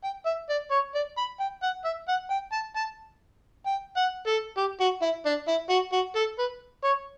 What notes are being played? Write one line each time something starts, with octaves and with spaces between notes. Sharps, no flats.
G5
E5
D5
C#5
D5
B5
G5
F#5
E5
F#5
G5
A5
A5
G5
F#5
A4
G4
F#4
E4
D4
E4
F#4
F#4
A4
B4
C#5